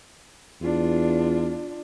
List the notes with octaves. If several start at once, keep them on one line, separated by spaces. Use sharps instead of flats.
E2 D4 F4